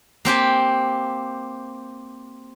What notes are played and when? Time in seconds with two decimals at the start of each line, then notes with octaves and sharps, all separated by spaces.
0.25 A#3 C4 G4 G#5